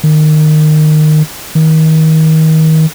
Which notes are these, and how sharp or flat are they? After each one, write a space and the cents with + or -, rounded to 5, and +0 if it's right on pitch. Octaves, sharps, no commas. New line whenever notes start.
D#3 -20
D#3 +30